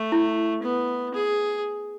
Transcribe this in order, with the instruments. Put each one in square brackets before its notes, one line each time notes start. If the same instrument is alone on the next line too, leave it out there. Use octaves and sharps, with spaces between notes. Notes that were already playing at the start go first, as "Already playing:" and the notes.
Already playing: [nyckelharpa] A3
[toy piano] E4
[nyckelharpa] B3
G#4